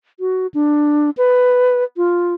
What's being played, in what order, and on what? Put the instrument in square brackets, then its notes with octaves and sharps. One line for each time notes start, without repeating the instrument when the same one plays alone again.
[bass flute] F#4
D4
B4
F4